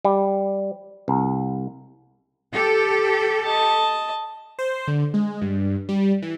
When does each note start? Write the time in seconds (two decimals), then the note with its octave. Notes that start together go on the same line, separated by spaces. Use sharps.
0.05 G3
1.08 C2
2.54 G4 A4
3.45 D#5 A5
4.59 C5
4.87 D3
5.14 G#3
5.41 G2
5.89 G3
6.22 E3